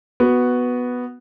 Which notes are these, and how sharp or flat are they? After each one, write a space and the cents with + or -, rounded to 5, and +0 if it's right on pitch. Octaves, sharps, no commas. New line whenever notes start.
B3 +0 F#4 +0